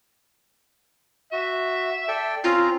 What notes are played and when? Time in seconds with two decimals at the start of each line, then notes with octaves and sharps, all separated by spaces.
1.33 F#4 E5
2.08 A4 D5 G5
2.44 C4 C#4 F4 A#5